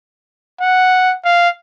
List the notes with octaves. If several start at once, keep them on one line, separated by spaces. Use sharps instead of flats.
F#5
F5